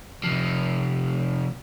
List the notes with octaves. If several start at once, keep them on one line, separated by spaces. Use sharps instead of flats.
C3 F3